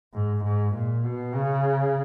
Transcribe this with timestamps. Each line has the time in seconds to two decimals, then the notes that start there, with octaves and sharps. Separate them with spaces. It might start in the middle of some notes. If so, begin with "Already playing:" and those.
0.14 G#2
0.44 G#2
0.74 A#2
1.04 B2
1.35 C#3